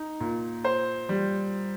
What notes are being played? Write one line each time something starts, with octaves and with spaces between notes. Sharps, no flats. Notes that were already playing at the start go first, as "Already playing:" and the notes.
Already playing: D#4
A#2
C5
G3